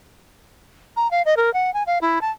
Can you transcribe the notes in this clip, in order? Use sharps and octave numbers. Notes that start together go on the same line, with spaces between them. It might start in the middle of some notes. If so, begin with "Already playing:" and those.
A#5
F5
D#5
A#4
F#5
G#5
F5
E4
A5